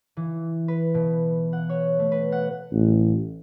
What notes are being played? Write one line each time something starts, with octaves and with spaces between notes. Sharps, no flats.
E3
B4
B2
F#5
C#5
A3
B4
F#5
A1